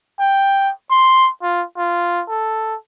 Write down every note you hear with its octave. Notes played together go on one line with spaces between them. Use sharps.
G5
C6
F4
F4
A4